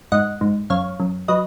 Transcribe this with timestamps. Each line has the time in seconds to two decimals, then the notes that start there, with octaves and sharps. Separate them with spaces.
0.12 G#2 D#5 F#5
0.41 G#2
0.70 F#2 C#5 F5
1.00 F#2
1.28 F#3 B4 D#5